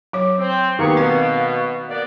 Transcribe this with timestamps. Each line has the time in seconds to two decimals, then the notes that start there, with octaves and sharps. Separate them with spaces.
0.13 F#3 C#5 D6
0.39 C4
0.79 D#3 A#3 B3 G4 G#4 F5 C#6
0.97 B2 C4 B4 F#5
1.89 A#3 B3 D5